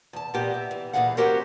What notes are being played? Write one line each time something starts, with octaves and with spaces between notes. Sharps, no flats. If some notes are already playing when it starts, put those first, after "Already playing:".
E2 A5
A#2 B3 G4 D#5
E5
E3
G2 A#2 E3 G#4 F5 F#5
C#4 F#4 G4 A#4 C5 C#5